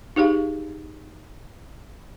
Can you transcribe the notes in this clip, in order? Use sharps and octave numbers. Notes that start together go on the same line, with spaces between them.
D#4 G4 G#4 F5